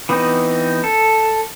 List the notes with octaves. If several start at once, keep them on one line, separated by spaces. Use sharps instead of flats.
E3 B3 C4 D#4
A4